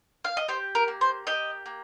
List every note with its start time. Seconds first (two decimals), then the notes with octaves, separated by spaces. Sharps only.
0.25 F5
0.37 D#5
0.48 G4 C5
0.75 A#4
0.88 A#3
1.01 C5
1.27 G4 D#5
1.66 A#3